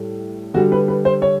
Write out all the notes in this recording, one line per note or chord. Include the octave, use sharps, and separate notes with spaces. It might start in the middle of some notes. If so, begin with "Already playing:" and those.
Already playing: A2 G3
D3 G3 F#4
B4
B4
C5
C#5